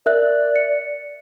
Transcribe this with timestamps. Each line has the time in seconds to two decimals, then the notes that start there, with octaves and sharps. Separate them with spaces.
0.06 A#4 D5 E5 F#6
0.56 C#7